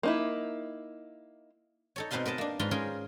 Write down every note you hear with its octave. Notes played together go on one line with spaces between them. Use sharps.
A#3 D#4 E4
D#4 A4 C#5
B2 C4 D#4 B4 F5 C6
A#4 B4 D#5 A5
A#3 D4
G#2 F4 B4 A#5 C6
C#4 F4 G#4 A#4 C5 G5